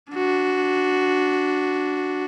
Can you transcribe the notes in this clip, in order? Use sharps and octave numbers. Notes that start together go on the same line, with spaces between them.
D4 F#4